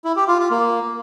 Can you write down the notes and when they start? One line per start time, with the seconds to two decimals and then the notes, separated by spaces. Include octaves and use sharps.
0.05 E4
0.16 G4
0.28 F4
0.39 F4
0.51 A#3